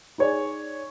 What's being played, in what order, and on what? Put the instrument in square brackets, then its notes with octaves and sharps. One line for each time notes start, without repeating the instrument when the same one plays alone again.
[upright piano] D#4 G#4 C#5 D5